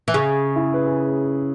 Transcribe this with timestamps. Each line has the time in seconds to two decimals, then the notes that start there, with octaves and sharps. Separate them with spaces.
0.08 E3
0.14 C#3 G#4
0.56 E4
0.74 B4
0.86 G#4